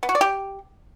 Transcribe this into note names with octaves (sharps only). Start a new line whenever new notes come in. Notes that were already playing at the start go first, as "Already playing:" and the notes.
B3
F#4
D5
G4